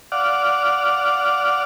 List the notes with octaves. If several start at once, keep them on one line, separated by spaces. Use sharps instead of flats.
D5 F5 F#5